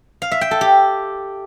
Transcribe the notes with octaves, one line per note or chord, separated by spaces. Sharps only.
F5
E5
G5
A4
G4